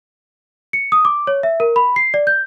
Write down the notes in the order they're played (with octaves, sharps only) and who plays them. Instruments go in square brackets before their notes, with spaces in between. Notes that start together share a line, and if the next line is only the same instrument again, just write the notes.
[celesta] C#7
D#6
D6
C#5
E5
A#4
B5
C7
D5
G6